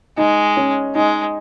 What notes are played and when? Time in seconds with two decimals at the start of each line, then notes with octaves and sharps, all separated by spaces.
0.17 G#3 D#4
0.57 C#4
0.95 G#3 D#4